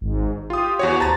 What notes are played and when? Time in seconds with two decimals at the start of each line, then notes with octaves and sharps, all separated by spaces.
0.01 G#1 G#2
0.50 F4 G4 D#6
0.79 E2 F#4 C#5
1.00 D2 C5 A5 A#5 A6